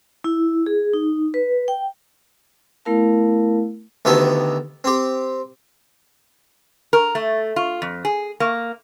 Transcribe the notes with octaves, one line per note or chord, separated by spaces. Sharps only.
E4
G#4
D#4
B4
G5
A3 B3 E4 A#4 F5 A5
D2 D#3 B3 G4 A4
C4 G4
A#4
A3
F4
F2
G#4
A#3